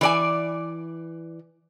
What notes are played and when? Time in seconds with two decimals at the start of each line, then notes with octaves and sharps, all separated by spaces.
0.01 E3 D5 G#5